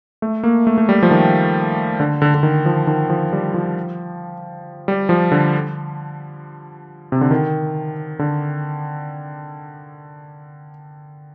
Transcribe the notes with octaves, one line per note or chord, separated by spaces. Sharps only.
A3
A#3
A3
A3
G3
F3
D#3
D3
D3
D3
D#3
F3
D#3
F3
G3
F3
G3
F3
D3
C3
D3
D#3
D3